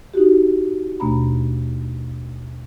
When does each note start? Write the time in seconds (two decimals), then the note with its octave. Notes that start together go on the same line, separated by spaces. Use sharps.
0.14 D#4 E4 F#4 G4
1.00 D#2 B2 A3 D4 A#5 B5